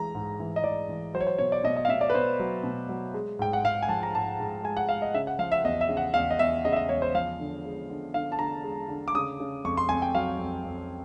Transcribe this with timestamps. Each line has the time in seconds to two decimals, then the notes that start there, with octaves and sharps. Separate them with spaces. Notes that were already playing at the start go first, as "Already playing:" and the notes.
Already playing: E3 G#3 A#5
0.15 G#2
0.40 E3
0.56 D#5
0.64 E3 D5
0.89 E3
1.14 F#3 C5
1.20 C#5
1.27 C5
1.38 B2 C#5
1.52 D5
1.64 B2 D#5
1.76 D#5
1.85 F5
1.89 B2 E5
2.01 D5
2.10 B4
2.14 B2 C5
2.40 F#3
2.64 B2
2.89 F#3
3.14 G#3
3.39 G#2 G5
3.53 F#5
3.64 G#2 F5
3.82 G#5
3.89 F3 A5
4.03 A#5
4.14 G#2 A5
4.40 G#2
4.64 G#3 G#5
4.77 F#5
4.89 G#3 F5
5.02 D#5
5.14 C#3 E5
5.27 F#5
5.39 F3 F5
5.52 E5
5.64 E2 D#5
5.81 E5
5.89 C#3
5.97 F#5
6.14 E2 F5
6.31 D#5
6.39 E2 E5
6.65 C#3 D#5
6.73 E5
6.76 D#5
6.89 E2 C#5
7.02 C5
7.14 F3 F5
7.39 D3
7.65 G#3
7.89 D3
8.14 D3 F5
8.32 A5
8.39 D3 A#5
8.64 G#3
8.89 D3
9.08 D6
9.15 C#3 D#6
9.40 C#3
9.64 F2 C#6
9.77 C6
9.89 F2 G#5
10.02 G5
10.15 F#3 F5
10.39 F2
10.65 F2